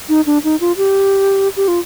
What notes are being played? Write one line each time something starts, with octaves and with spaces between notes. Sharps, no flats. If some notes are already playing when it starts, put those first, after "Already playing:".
D#4
D4
D#4
F4
G4
G4
F4